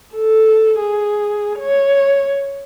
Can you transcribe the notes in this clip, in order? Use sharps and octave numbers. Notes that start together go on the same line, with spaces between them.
A4
G#4
C#5